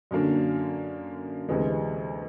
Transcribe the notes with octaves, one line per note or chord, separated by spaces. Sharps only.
F#2 D3 F#3 A#3 D4
D2 C3 E3 G#3